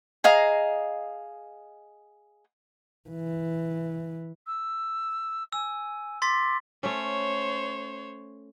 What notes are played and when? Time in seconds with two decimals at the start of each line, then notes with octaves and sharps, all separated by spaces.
0.24 G#4 D#5 F5 A#5
3.09 E3
4.46 E6
5.52 G#5 E6
6.22 C6 D6 A6 B6
6.83 A3 C#4 C5 C#5